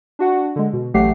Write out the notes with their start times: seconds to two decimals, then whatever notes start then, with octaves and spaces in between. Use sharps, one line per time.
0.19 D4 F#4 F#5
0.56 D3 G#3
0.73 B2
0.94 A1 F#3 A3 G4 F#5 C7